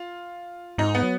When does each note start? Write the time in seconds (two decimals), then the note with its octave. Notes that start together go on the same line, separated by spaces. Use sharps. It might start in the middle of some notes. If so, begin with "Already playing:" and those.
Already playing: F4
0.78 G#2 D#4
0.95 B3
1.03 F#3